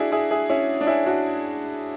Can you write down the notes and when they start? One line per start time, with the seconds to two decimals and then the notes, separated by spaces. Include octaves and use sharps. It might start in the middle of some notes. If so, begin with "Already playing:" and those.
Already playing: D4 E4 F#4 G#4
0.12 E4 G#4
0.31 E4 G#4
0.49 C#4 E4
0.81 D4
0.87 C#4 E4
1.06 D4 F#4